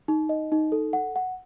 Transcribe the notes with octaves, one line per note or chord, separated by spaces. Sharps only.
D#4
D#5
D#4
A4
F#5
F#5